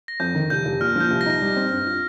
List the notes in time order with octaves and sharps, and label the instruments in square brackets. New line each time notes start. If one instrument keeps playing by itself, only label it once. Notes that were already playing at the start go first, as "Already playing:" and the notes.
[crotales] A#6
[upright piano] F2 [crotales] G6
[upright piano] D#3
[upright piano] F1 [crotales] G6
[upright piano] F1
[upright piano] A#2 [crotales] F6
[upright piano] F3 [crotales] G6
[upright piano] C2
[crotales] A#6
[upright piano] D#4
G3
C4
G2
F4